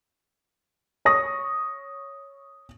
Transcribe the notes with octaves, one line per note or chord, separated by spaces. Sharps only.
C#5 C#6 D#6 A#6